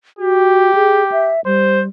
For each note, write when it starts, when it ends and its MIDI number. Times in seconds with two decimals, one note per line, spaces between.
0.19 0.71 66
0.19 1.33 67
0.75 1.03 68
1.12 1.41 76
1.46 1.88 55
1.46 1.81 72